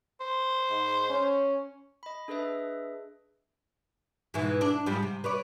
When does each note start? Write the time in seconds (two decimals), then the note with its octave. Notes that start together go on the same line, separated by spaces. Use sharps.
0.20 C5
0.70 G#2
1.10 C#4
2.03 D#5 B5
2.28 D4 G#4 A4 B4 D#5 E5
4.34 G#2 B2 E3
4.61 D4
4.86 G#2 F3 G3
5.03 C3
5.24 B4 C#5 D5